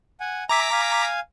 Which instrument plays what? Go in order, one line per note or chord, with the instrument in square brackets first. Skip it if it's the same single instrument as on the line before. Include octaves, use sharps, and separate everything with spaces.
[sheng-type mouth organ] F#5 G#5
[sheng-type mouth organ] E5 G#5 [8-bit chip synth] A#5 D6 B6
[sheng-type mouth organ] F5 G#5